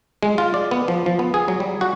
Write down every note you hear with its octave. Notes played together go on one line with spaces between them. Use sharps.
G#3
F4
D5
B3
F3
F3
B3
G#4
F#3
G3
F#4